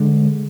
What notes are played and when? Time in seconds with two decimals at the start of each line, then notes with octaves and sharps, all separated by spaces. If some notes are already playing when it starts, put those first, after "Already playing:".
Already playing: D3 G#3